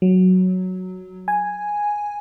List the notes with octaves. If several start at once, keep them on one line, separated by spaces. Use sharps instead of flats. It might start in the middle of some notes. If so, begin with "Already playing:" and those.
F#3
G#5